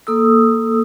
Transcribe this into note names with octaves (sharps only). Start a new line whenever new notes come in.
A#3 A4 D#6 E6